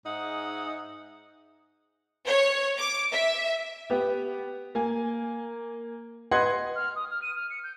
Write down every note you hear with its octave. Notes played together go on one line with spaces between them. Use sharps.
G#2 D#4 G#4 E5 F#5
C#5
D6
E5
B3 G4
A#3 G#5
B4 D#5 F#5 C6 G#6
F6
D#6
F6
D#7
F6
C#7
G6